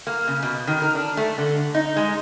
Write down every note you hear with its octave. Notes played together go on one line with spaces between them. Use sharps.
A#3
C#3
B2
D#3
A#4
D4
A3
D3
D#4
G#3